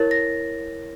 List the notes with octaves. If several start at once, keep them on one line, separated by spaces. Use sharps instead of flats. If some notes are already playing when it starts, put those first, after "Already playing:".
Already playing: E4 A#4 C#5 A6
A#6